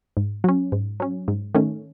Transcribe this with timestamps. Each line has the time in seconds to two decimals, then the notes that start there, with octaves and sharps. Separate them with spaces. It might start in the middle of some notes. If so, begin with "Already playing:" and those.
0.17 G#2
0.44 F#3 C#4
0.72 G#2
1.00 F#3 C#4
1.28 G#2
1.55 D#3 A3 C#4